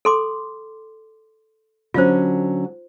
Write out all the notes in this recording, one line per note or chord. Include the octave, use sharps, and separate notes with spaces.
A4 C6 D6
D3 F#3 C#4 F4 C5